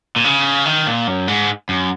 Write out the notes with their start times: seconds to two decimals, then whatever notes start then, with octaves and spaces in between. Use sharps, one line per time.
0.16 A#2
0.24 C#3
0.66 D#3
0.87 A#2
1.07 F#2
1.28 G#2
1.69 F#2